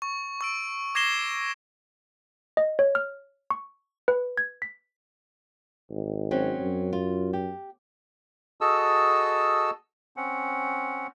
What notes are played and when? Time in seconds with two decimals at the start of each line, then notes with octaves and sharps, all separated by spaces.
0.02 C#6
0.41 C#6 E6 D7
0.95 D6 G#6 A#6 C7 E7 G7
2.57 D#5
2.79 C#5
2.95 F6
3.50 C#6
4.08 B4
4.38 G#6
4.62 B6
5.90 G#1
6.31 F#3 C4 C#4
6.61 F#2
6.93 F4
7.33 G4
8.61 F#4 G#4 A4 D#5 A5 E6
10.17 C4 C#4 F#5